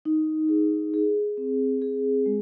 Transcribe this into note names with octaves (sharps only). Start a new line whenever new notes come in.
D#4
G#4
G#4
C4
G#4
G#3